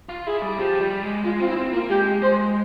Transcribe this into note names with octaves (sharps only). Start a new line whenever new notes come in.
F4
E4 G#4
G3
F3 G4
G3
G#3
G#3 F4
C4 F4
E4
C4 F4
A#3 F4
G#3 G4
G#3 C5